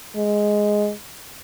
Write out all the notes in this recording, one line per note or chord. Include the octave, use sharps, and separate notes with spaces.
G#3